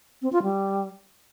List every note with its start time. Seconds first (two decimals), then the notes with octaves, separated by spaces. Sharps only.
0.22 C4
0.32 F4
0.43 G3